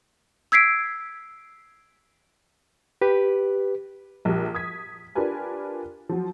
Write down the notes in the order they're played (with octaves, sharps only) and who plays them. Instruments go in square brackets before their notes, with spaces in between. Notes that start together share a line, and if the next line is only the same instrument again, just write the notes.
[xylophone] E6 G#6 B6 C7 D7
[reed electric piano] G4 B4
[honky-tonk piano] A#1 G4
D#6 G#6 B6
D4 F4 G4 A#4 B4 G#5
F3 F#3